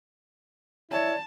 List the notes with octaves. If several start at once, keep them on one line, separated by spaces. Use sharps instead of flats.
E4 C#5 D5 A5